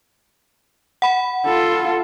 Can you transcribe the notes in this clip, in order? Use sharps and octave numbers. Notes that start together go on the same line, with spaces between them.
F#5 B5
F4 A4